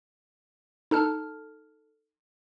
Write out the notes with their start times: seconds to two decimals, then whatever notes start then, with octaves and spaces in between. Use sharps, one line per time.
0.91 D#4 A4 A5 F6